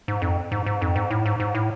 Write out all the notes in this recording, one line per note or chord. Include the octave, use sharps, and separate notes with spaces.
G#2
F2
G#2
G#2
F2
G#2
A2
G#2
G#2
A2